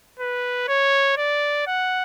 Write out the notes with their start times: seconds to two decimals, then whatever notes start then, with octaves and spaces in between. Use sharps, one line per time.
0.19 B4
0.68 C#5
1.18 D5
1.67 F#5